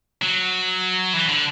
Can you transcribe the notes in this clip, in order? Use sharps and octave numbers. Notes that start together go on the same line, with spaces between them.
F#3
E3
D3